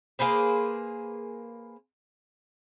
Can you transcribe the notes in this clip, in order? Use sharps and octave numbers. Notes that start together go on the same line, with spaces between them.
A#3 G#4 B4 C5